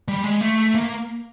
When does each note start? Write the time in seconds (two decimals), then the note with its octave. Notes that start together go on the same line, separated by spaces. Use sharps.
0.08 G3
0.24 G#3
0.41 A3
0.75 A#3